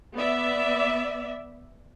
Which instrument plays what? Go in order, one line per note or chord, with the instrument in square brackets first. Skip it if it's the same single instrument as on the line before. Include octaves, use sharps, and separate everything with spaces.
[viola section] B3 D5 E5